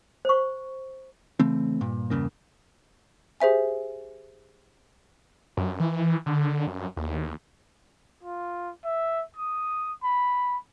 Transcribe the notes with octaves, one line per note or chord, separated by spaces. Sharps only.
C5 C#6
C#3 E3 A3 C4
G2 A#2
E2 G2 C#3 A#3
G4 G#4 C5 E5 G#5
F#2
E3
D3
F#2
D#2
F4
E5
D#6
B5